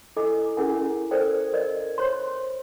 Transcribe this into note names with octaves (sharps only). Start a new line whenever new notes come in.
E4 A4 D#5 G#5 D6
C#4 E4 G#4 A#4 F#5 G#5
A4 A#4 C5 D5 G5
A#4 D5 D#5
C5 C#5 C6